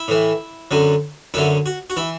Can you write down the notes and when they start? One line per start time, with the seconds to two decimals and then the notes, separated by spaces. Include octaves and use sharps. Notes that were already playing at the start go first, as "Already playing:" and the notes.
Already playing: E4
0.08 A2 E3
0.71 F#2 D3 F#3
1.34 F#2 D3 F#3 E4
1.66 F#4
1.90 F#4
1.97 E3 E4